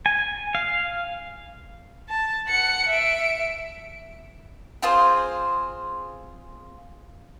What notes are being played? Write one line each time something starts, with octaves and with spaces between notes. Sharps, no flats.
G#5
F5
A5
F#5 C#7
E5 D7
C4 F4 G#4 C5